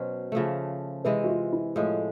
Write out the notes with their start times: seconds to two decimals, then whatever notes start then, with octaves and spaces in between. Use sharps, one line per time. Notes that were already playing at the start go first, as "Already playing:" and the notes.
Already playing: B2 F#3 C#4 C5
0.32 C#3 F3 A3
1.04 C3 E3 G#3 B4
1.24 F#4
1.28 F4
1.52 E4
1.76 A2 F3 G#3 F4